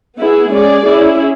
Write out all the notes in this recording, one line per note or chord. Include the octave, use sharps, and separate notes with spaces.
B3 E4 G#4
G#3 C#4 G#4 D5
C#4 E4 G#4